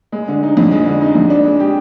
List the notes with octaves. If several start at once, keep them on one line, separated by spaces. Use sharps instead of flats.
G#3
D3
D#4
F2
G#3
D3
D#4
F2
D4
G#3
G4